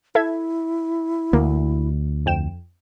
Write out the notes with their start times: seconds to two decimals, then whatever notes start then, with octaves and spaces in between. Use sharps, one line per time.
0.15 E4 A4 E5 G#6
1.33 D2 A#3
2.26 F2 G5 E7